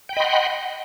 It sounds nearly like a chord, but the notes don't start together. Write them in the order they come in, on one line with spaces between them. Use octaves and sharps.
G5 B5 D#5 C6 F#5